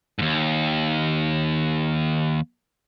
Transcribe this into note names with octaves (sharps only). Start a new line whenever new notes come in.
D#2 G#2